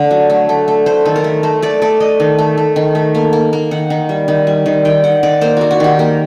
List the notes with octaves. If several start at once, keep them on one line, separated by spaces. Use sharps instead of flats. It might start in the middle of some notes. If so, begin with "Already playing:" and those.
Already playing: D3 A3 D5
F#3
A3
A3
A3
A3 C5
D#3 A4
A#4
A3
A3 C5
A3 D5
A3 D5
A3 D#5
D#3
A3
A3
D#3
A3
A#3
A#3
A#3
D#3 F#5
D#3
G3
D#3
G3
D#3
D#3 G5
D#3 F#5
D#3 D5
A#3 C5
A#3 F#4
F#4
D#3 G4
A#3 A#4